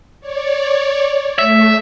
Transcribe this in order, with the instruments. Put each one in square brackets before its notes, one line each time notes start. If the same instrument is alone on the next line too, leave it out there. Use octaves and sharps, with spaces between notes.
[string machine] C#5 D5
[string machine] A3 [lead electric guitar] E5